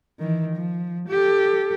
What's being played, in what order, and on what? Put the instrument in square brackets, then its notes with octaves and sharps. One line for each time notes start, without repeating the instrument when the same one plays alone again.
[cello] D#3 E3
F3
G4 A4